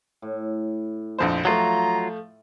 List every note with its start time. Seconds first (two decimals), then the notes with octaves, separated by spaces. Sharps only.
0.22 A2
1.19 A#1 F2 C5
1.45 F3 F#3 A3 F4 A#5